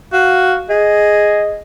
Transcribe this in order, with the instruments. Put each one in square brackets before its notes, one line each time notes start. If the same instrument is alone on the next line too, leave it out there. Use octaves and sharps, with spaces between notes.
[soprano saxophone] F#4 [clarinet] F5
[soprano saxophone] G#4 [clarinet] D#5